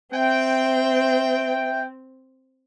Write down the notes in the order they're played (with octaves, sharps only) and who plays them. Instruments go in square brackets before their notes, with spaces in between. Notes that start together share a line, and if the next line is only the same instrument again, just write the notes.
[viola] C4 [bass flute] E5 [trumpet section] G5